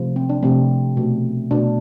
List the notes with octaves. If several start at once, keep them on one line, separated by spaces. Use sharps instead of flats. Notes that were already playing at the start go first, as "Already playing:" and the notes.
Already playing: C3 F3 A3
C4
D4
C3 F3 A3 C4
B2 A3
B2 A3 D4